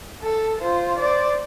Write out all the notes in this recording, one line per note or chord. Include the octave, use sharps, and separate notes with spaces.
A4
F4 C5
C5 D5